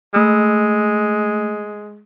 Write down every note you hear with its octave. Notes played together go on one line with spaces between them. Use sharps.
G#3 A3 E6